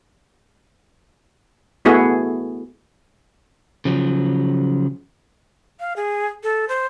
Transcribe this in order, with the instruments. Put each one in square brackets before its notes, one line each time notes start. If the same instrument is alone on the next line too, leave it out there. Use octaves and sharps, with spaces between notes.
[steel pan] A3 B3 E4 F#4 G#4
[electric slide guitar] C#3 F3 F#3
[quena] F5
G#4
A4
C5